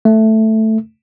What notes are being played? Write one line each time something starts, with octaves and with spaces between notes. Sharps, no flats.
A3